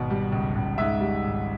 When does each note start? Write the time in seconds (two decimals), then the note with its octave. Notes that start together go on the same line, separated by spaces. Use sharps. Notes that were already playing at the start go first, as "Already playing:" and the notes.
Already playing: G#1 B2
0.10 G3
0.32 C#2
0.56 C#2
0.78 G#2 E5
1.01 G3
1.23 G#1